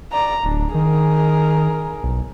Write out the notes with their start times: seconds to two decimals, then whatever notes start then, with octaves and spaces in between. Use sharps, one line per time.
0.12 D5 A#5
0.44 D1 D4
0.75 D#3 G#4 A#4
2.03 B1